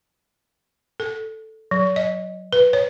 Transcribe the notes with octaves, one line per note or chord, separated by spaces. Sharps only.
A4
F#3
D#5
B4
C#5